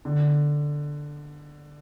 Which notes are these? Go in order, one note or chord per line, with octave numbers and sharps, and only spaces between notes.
D3